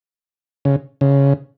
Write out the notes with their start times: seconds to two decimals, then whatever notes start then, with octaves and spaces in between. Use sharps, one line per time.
0.65 C#3
1.01 C#3